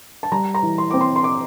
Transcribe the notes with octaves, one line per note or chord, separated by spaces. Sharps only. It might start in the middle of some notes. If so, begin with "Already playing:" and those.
A5
G3 A#5
A#5
E3
C6
C4 D6
C6
C6
D6